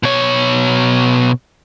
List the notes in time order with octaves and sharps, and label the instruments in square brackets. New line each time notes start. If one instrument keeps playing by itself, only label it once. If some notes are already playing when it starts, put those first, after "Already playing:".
[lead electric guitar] B2 C#5